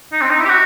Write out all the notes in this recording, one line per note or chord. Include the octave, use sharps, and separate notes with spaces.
D#4
C4
D#4
E4
G4
F#4